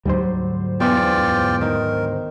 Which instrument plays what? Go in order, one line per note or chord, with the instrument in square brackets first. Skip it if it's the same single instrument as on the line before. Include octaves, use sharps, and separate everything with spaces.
[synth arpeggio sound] D2 G#2 C5 [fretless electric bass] F#3 G3
[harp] E2 B4 [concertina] F4 D5 G5
[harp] D#3 [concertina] A#4